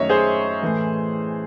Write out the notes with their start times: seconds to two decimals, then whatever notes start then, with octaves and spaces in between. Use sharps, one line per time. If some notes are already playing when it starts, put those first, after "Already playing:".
Already playing: F#2 D#3 A3 C#5 D#5 E5
0.09 G#4 C5
0.62 A2 E3 A3